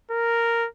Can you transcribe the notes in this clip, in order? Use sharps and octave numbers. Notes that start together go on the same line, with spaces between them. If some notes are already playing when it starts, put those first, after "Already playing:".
A#4